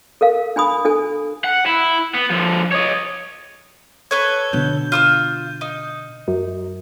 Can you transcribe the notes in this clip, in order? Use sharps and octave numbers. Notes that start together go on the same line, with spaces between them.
A4 A#4 F5
D4 G#5 B5 D#6
D4 A4 G#5
F#5
E4
B3
D3 F3
C#5 D#5
A4 B4 C#5 G#6
B2 D3 G6
F4 D#6 E6
D#4
F#2